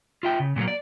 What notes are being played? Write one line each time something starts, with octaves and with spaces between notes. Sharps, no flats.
F4 E5 G5
C#3
A#2 F#3 G#3 A#3
D5